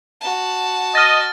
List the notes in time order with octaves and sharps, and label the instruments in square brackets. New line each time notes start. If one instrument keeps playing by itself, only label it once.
[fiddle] F#4 A5
[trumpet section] D#5 [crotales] F6 A6